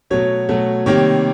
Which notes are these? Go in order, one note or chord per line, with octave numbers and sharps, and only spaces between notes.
B2 F#3 A3 C#5
B2 F#3 A3
C3 D#3 G3 A#3 C#5